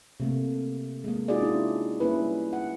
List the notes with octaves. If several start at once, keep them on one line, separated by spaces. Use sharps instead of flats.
C3 A3 A#3
G#3 A#3
D#4 F4 F#4 G#4 D5
C#4 D4 E4
G3 A#3 C#4 E4 B4
F#5